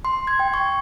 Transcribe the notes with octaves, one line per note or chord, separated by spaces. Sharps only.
C6
G#6
G5
C#6